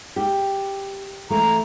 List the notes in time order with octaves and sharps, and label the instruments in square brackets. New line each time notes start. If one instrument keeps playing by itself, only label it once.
[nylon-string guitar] G4
[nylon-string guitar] E3 A3 [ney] A#5